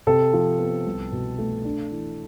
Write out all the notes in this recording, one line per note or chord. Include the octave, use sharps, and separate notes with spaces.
C3 A4
F3
B3
C2
B2
A3
D4
E3